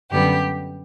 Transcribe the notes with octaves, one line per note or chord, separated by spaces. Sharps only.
F#2 D3 G3 B3 G4